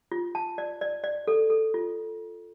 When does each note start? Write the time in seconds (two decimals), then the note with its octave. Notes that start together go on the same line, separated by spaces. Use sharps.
0.12 F4
0.35 A5
0.58 D5
0.81 D5
1.04 D5
1.27 A4
1.50 A4
1.74 F4